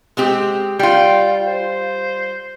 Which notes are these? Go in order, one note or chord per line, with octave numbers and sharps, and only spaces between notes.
G#3 C4 G4
G3 F4 G5
C5